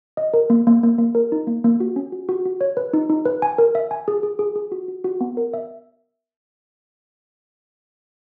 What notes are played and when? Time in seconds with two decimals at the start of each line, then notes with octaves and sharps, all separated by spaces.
0.17 D#5
0.34 A#4
0.50 A#3
0.67 A#3
0.83 A#3
0.98 A#3
1.15 A#4
1.32 D#4
1.47 A#3
1.64 A#3
1.80 F#4
1.96 C#4
2.12 F#4
2.29 F#4
2.46 F#4
2.61 C#5
2.77 B4
2.93 D#4
3.10 D#4
3.25 B4
3.42 G#5
3.58 A#4
3.75 E5
3.91 G#5
4.08 G#4
4.23 G#4
4.39 G#4
4.56 G#4
4.72 F#4
4.88 F#4
5.04 F#4
5.21 B3
5.37 A#4
5.54 E5